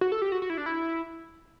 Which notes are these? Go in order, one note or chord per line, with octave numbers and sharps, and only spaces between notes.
F#4
A4
G4
F#4
F#4
E4
D4
E4